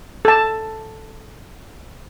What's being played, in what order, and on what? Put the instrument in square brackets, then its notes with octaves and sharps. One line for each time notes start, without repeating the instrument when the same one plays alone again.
[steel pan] A4 A5